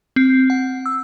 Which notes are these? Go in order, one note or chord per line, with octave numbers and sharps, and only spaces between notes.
C4
F#5
E6